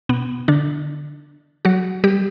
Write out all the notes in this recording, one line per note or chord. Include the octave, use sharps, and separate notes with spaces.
B2 B3
D3 D4
F#3 F#4
G3 G4